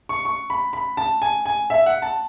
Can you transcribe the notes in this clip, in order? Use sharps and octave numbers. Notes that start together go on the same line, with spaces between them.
C#6
C#6
B5
B5
A5
G#5
G#5
E5
F#5
A5